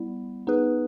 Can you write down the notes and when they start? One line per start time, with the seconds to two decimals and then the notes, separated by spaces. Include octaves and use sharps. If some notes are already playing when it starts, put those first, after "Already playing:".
Already playing: G3 B3 E4
0.47 B3 D#4 G#4 B4